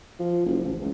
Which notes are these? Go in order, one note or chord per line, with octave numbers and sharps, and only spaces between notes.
F3
F#1
A1
C#2